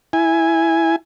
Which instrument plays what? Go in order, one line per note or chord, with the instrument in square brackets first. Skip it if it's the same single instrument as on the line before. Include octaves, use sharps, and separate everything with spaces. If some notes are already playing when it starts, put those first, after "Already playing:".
[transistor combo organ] E4 G#5